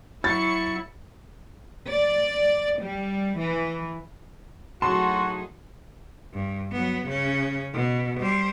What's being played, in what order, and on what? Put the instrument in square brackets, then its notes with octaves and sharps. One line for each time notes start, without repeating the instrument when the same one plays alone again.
[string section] F#3 C#6 C#7 [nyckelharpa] E4 [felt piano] A6
[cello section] D5
G3
E3
[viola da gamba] A2 F#3 G#4 [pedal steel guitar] D#4 A5 [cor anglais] F#4 [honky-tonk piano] C6
[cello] G2
F#3 B3
C#3 C#4
B2
G3 C5